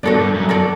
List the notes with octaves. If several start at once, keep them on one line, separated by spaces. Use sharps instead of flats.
G2 F#4 A4 D5
G2
F#2
F#2 F#4 A4 D5